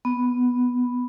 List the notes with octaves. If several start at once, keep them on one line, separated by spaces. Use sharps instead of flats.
B3